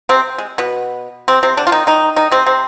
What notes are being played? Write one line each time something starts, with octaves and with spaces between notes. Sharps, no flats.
C3 C4
G#3
B2 B3
C3 C4
C3 C4
D3 D4
F4
D#3 D#4
D#3 D#4
D#3 D#4
C3 C4
C3 C4